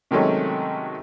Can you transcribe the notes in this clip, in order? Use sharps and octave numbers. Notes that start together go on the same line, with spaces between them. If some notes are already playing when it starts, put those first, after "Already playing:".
C3 D#3 F#3 G#3 A3 C#4